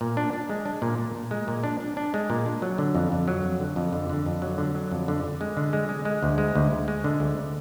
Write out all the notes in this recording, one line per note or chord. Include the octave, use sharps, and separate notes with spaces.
A#2
D4
D4
G#3
D4
A#2
A#2
A#2
G#3
A#2
D4
D4
D4
G#3
A#2
D4
F#3
D3
F2
F2
F#3
F2
D3
F2
D3
D3
F2
F#3
D3
F#3
F2
D3
D3
G#3
D3
G#3
G#3
G#3
D2
G#3
D2
D2
G#3
D3
D2